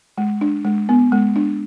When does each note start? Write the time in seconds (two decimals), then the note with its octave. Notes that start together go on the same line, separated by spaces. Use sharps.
0.18 G#3
0.41 D4
0.65 G#3
0.89 B3
1.12 G#3
1.36 D4